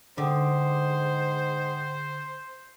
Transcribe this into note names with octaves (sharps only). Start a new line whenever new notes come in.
G#2 D3 C5 F#5 G5 D#6